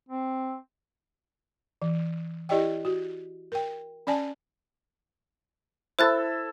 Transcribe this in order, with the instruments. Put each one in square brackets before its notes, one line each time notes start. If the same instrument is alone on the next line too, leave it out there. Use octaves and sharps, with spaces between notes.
[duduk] C4
[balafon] E3
E4 G4 D5 D#5 G5
F#4
A#4 G5
C#4 D5 G#5 A5
[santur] E4 A4 E6 [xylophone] C5 F#6 A6